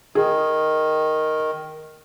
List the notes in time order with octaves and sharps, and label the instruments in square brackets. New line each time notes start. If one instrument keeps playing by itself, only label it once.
[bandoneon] D#3 [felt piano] G#4